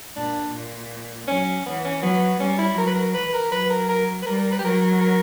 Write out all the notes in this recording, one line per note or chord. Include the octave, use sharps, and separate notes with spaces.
A#2 D4
A#2
F#3 C#4
E3 B3
C#4
F#3 B3
G3 C#4
E4
F#3 A#4
B4
A#4
E3 B4
A#4
F#3 B4
A#4
A#4
B4
G3 A#4
A#4
B4
G4
F#3 A#4
A#4